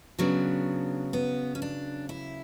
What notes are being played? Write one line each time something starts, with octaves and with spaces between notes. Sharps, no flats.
C#3 F#3 B3 D4
B3
C#4
D4
E4